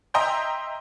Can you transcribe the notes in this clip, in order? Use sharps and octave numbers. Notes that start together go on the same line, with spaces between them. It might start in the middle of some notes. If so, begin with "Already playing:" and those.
D#5 E5 G5 A#5 C6 G6